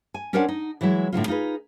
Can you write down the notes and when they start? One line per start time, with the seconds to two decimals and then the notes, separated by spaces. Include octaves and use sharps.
0.14 G#5
0.33 C#4 D4 A#4 C5 D5 F#5
0.49 D#4
0.81 E3 F#3 G#3 E4
1.13 A2 D3 F#3 F4
1.28 D#4 F4 G#4 B4